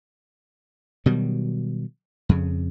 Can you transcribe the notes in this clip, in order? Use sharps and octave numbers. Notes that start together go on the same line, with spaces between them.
B2 D#3 F#3 G3
F2 C#3